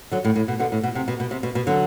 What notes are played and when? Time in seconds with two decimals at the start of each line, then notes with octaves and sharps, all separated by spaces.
0.12 D3 F#3
0.25 A2
0.36 A2
0.48 B2
0.59 B2 D3
0.72 A2
0.83 B2
0.95 C3
1.08 B2
1.20 B2
1.31 C3
1.43 B2
1.55 B2
1.67 D3 F#3